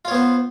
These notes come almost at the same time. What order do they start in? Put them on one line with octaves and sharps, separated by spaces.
F4 C#5 B3 C5